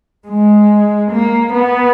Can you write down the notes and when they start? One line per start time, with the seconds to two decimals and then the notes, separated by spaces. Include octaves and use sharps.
0.28 G#3
1.12 A#3
1.53 B3